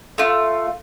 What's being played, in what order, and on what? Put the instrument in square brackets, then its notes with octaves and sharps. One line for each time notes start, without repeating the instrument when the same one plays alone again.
[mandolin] A3 F4